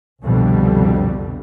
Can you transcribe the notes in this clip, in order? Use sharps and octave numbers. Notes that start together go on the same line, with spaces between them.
C2 F2 B2 D3 G3